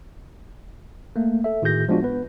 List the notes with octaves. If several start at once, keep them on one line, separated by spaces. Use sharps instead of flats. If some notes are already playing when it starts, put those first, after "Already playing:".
A3 A#3
A4 E5
A2 D#3 F#4 G#4 G6 A#6
F3 G#3 B3 D4 F4 F#4
B3 B4